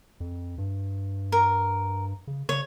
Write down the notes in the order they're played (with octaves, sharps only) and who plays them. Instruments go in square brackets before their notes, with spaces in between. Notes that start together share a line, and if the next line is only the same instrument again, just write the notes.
[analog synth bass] F2
G2
[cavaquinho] A#4
[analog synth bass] C#3
[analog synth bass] C#3 [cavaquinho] C#5